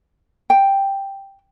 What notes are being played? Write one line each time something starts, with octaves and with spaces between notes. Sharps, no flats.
G5